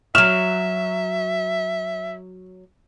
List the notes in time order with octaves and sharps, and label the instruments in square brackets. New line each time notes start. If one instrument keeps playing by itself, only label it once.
[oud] F#3 C#5 [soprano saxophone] E5 [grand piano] F6 [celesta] E7